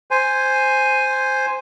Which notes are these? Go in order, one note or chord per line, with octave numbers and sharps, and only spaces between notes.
C5 G#5